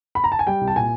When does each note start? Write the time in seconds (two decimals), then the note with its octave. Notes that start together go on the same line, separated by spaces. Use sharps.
0.15 B5
0.24 A#5
0.32 A5
0.39 G#5
0.47 G3 G5
0.61 C2
0.68 A5
0.76 A#2 G#5